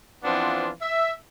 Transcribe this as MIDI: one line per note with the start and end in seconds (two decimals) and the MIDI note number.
0.24 0.69 52
0.24 0.69 53
0.24 0.69 59
0.24 0.69 60
0.24 0.69 62
0.24 0.69 65
0.82 1.12 76